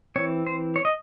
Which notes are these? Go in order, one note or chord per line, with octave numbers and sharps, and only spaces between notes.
E3 C4 C#5
C5
C#5
D#5